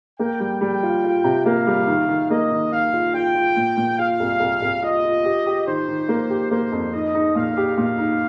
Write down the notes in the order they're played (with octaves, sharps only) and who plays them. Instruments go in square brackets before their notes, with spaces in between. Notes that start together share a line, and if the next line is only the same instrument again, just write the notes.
[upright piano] A#3 [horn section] G5
[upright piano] G3
[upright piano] G3 [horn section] G5
[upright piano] F4
F4
C3
[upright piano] A#3 [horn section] F5
[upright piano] G3
D#3
D#3
[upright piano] A#3 [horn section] D#5
[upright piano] D#3
[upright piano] D#3 [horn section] F5
[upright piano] F4
[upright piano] F4 [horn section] G5
[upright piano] F4
A#2
A#2
[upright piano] F4 [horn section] F5
[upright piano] C2
C2
C2
[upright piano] F4 [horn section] D#5
[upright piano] F4
G4
G4
[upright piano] D#3 [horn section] C5
[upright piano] D#3
A#3
G4
[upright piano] A#3 [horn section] C5
[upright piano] F2
[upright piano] D#4 [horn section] D#5
[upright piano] D#4
[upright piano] A#2 [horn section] F5
[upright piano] G4
[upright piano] A#2 [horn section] F5
[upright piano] D#4